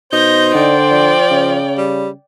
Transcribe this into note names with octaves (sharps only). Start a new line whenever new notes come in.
B2 D#4 C5 G6 A#6
D3 D5 G5
F3
C#3
G3